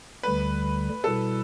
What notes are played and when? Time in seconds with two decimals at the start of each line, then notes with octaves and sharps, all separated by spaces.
0.23 D2 D3 G3 B4
1.04 B2 G3 E4 A4